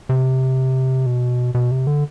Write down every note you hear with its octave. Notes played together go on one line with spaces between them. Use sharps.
C3
B2
B2
C3
D3